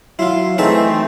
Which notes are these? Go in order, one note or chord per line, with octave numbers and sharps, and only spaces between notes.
F#3 E4 F4 C6
E3 A3 C4 D#4 G#4 E5